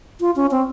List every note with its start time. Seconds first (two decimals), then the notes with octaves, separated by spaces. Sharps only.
0.20 F4
0.36 C#4
0.51 C4